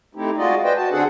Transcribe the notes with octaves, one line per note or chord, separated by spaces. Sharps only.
A3 C4 D#4 E4 G4
G#3 F4 F#4 D5 D#5
B4 C5 D5 D#5 G5
F#4 A5
D3 C4 D4 G#4 A4 F#5